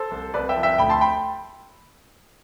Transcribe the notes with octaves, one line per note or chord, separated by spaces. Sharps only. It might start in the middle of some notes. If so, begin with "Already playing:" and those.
Already playing: A4 C5
C2
C2 B4 D5
E5 G5
F3
E5 G5
D2 G5 B5
A5 C6
G5 B5